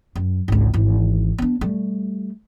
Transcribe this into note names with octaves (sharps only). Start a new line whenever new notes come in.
F#2
G#1 C#2
G#1 E3
B3 D4
G3 A3